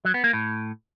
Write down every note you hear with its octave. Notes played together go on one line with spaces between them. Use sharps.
F#3
B3
A#3
A2